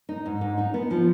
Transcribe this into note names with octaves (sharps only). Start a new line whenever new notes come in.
D#4
G#2
G#2
D#4
B3
F3